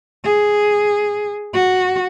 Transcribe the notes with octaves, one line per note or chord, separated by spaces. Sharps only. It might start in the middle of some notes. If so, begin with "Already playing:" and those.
G#4
F#4